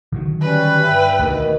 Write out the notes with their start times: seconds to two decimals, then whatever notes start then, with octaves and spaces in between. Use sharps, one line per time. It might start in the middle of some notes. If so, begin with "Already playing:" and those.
0.12 D3 D#3 F#3
0.42 G3 C#4 B4
0.84 G2 E5 G5
1.20 D2 B2 D#3